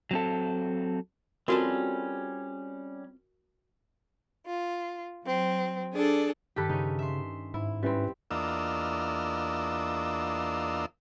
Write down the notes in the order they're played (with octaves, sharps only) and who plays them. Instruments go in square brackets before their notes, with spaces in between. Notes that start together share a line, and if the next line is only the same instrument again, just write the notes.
[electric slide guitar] F#3 C4 A4
[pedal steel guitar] G3 C#4 [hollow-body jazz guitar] C4 F4 A4 [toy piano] F#4 A#4
[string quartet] F4
F#3 C4
D4 G#4 A4 D5
[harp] G2 D#3 [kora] G4 A4 B4
[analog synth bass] C#3 [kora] C#4 D#4
[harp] E5 C6
[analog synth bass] G#2 [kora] E4
[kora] G3 C4 [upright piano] C#4 E4 B4
[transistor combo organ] E2 A#3 D4 F4 D#5 E6